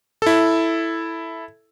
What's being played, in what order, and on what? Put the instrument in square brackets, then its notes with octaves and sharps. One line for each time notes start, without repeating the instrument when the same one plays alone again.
[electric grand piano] E4 A4